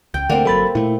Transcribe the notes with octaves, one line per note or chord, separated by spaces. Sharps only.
C#2 G5 G6
D2 D3 A3 A#3 C4 D5 F#5 G5
G1 F#3 A4 B5 A6
A#2 A3 E4